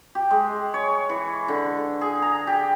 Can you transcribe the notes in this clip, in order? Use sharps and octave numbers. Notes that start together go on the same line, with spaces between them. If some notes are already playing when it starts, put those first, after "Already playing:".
G4
G#3
C#5
E3
D3
G#4
A#5
G4